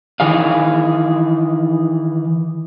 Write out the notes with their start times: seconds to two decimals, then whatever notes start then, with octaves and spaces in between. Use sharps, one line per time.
0.20 D#3 E3 G#4 F5